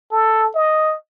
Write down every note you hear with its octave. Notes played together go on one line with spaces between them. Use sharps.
A4
D#5